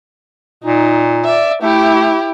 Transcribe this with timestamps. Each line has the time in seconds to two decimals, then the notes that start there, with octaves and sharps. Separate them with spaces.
0.64 A#2 D#4
1.25 D5 E5
1.62 A3 E4 G4